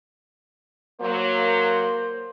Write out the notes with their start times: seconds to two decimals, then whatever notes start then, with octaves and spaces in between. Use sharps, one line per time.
1.01 F#3 A#3 C5